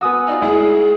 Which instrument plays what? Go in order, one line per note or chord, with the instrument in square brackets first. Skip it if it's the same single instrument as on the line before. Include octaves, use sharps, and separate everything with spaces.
[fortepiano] B3 F#4 [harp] G#5 D#6 E6
[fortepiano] D#4 F4 [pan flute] D5
[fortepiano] D2 G#3 E4 [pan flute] G#4